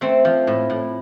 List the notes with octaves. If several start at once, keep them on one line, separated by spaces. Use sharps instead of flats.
A3 C4
F3
A2
A2